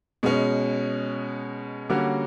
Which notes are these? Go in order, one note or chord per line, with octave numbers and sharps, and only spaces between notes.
B2 G#3 C#4
D3 G3 A#3 C#4 F#4